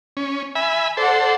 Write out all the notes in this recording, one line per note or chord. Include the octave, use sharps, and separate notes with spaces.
C#4
E5 G#5 B5
A4 C5 D5 F#5